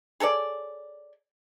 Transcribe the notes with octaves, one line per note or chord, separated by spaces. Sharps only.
G#4 A4 C#5 D5